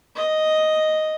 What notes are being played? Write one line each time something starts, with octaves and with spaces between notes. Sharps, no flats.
D#5